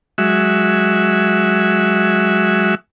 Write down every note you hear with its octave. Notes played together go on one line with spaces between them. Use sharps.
F#3 G#3 F#4 E5